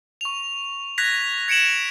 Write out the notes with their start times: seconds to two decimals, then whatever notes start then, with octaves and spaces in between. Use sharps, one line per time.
0.21 C#6 F7
0.98 F#6 G#6 A#6 B6 F7
1.48 G#6 C#7 D7 E7 F#7